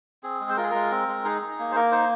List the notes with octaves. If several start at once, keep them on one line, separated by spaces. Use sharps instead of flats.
C4 G#4
G#3
C5
F4 A#4
G#4
G#3 A#4
C4
G#3
D#4 G#4
D#4
A#3
C5
A#3 A#4
D#4 C5